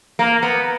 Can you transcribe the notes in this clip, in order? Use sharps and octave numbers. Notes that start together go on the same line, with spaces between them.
A#3
B3